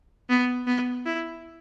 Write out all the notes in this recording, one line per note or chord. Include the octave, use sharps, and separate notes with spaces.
B3
B3
E4